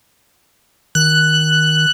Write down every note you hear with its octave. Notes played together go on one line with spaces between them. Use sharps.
D#3 F#6